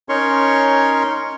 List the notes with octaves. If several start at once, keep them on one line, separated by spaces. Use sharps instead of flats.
C#4 D#4 A#4 C#5 C6 C#6